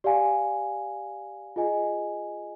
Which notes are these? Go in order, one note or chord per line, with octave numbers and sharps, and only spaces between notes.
G4 D5 F5 G#5
F4 G#4 D#5 G#5